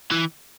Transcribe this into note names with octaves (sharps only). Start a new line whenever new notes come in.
E3